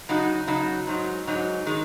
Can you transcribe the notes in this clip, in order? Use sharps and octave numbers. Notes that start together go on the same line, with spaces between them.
C#3 F#3 D#4 F#4
C#3 F#3 D#4 F#4
G#2 F#3 D#4
G#2 F#3 D#4
D#3 G#3